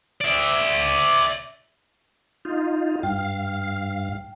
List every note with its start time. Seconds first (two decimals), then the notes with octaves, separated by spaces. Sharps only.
0.21 D5 E5
2.45 D#4 F4
3.03 G2 F5 G5